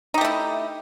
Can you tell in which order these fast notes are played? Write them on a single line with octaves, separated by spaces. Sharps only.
D#4 G4 A3 E4